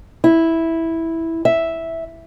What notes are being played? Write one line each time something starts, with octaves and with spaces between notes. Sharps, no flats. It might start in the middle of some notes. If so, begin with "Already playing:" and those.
E4
E5